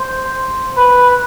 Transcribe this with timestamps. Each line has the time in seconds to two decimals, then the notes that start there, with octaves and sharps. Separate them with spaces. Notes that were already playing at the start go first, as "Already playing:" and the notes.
Already playing: C5
0.77 B4